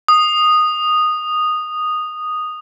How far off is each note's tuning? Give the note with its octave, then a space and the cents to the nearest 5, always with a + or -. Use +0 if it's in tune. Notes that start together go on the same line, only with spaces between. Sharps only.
D#6 -10